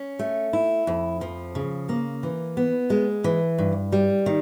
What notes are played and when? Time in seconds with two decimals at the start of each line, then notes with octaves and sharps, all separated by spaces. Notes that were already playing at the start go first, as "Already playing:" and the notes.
Already playing: C#4
0.19 A3
0.53 E4
0.87 F2
1.21 F3
1.55 C#3
1.89 A#3
2.23 E3
2.57 B3
2.90 G#3
3.24 E3
3.59 G2
3.92 G3
4.26 D#3